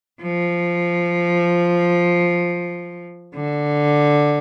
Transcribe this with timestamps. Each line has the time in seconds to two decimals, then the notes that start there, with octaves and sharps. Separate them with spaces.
0.22 F3
3.35 D3